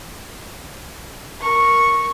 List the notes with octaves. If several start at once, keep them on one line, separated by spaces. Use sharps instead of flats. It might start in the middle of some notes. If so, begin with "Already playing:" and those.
A#4 C#6